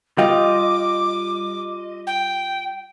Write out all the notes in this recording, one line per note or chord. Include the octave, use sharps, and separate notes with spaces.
G3 F4 G4 D#5 D6
G5